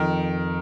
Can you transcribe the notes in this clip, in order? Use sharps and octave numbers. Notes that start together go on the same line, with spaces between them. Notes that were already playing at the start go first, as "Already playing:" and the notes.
Already playing: F2 D#3